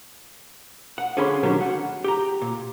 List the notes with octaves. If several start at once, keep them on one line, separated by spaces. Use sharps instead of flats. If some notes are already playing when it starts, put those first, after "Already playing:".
F#5
D3 C#4 G#4 F5 B5 C6
D3 D#3 F#3 G3 C#4 D4
F#5
G4 A#5
A#2